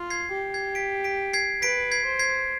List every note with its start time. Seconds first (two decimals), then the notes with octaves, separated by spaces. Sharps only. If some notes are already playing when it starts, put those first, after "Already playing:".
Already playing: F4
0.10 G#6 C7
0.32 G4
0.54 G#6 C7
0.75 B6 D7
1.04 B6 D7
1.33 G#6 C7
1.62 B4 B6 D7
1.92 G#6 C7
2.05 C5
2.19 G#6 C7